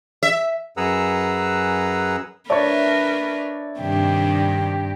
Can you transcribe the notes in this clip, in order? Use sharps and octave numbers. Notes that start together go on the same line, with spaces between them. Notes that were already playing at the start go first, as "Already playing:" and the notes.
E5
F#2 G#4 B4 F#5 A#5 E6
A3 D4 A#4 B4 C#5 D5 B5
G2 C3 D#3 D4 G4